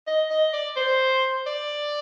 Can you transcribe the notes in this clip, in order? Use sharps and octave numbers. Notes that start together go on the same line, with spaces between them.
D#5
D#5
D5
C5
D5